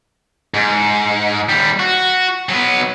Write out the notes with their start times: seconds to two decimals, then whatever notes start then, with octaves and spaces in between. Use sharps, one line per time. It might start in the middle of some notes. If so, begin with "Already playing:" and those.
0.54 G#2
1.49 D#2 G3
1.80 F#4
2.49 F#3 B3